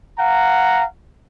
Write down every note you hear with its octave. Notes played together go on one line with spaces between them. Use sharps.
F5 F#5 A#5